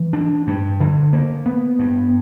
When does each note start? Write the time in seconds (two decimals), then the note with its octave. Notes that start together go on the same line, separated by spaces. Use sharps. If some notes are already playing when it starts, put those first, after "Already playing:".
Already playing: E3
0.13 D4
0.47 G2
0.80 D3
1.13 A#3
1.46 B3
1.79 G2